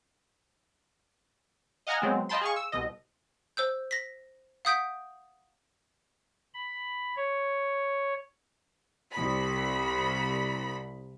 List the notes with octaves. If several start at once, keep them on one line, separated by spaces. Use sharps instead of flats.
D#5 F5 F#5 G#5 A#5 F6
F#3 G#3 B3 C4
D#5 F5 G5 A5 B5 C6
G#4 F5 C#6
E6
C2 B2 D#5
C5 E6 G6
A#6 B6
F5 F#5 D#6 G6 B6 D7
B5
C#5
C2 B5